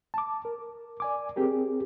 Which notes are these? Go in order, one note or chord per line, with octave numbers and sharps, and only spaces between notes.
A5 D6
A#4
D5 G#5 D6
C4 G4 G#4 A#4